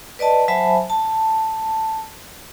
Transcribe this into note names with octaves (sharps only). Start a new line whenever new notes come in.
B4 D5 D#5 A5
F#3 C5 E5 G#5 A5 B5
A5